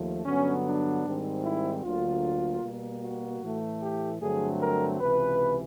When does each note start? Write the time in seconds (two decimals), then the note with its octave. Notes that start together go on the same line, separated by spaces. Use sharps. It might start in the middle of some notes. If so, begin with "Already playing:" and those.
Already playing: D#2 F3 A3
0.26 G2 D3 F#3 B3 C#4
0.65 D4
1.05 G#2 D#3 G3 C4
1.44 E4
1.84 D2 D3 F#3 A#3 F4
2.62 B2 G3 A#3
3.02 F#4
3.42 A2 E3 A3
3.81 G4
4.21 G2 D3 F#3 A3 C4 G#4
4.60 A#4
5.00 C#2 C3 E3 B4